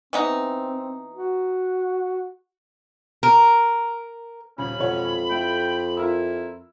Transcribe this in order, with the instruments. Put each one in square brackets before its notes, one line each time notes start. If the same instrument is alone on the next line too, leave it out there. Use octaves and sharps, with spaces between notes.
[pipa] E3 B3 D#4 [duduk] C4
[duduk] F#4
[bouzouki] A#4
[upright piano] D#1 C#3 [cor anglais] C#4 [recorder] B5
[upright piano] E1 C#5 F#5 [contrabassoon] F2
[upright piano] A3 E4 [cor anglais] G5
[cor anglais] E4 [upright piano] F4 A#4 E6